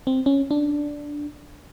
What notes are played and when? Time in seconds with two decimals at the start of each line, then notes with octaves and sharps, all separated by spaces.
0.07 C4
0.26 C#4
0.51 D4